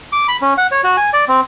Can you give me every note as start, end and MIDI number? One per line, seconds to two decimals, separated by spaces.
0.12 0.27 86
0.28 0.36 83
0.42 0.54 61
0.58 0.67 78
0.71 0.81 73
0.84 0.96 66
0.97 1.10 80
1.13 1.25 74
1.28 1.41 60